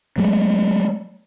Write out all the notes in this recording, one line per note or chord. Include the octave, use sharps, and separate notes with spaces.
F#3 G#3 A3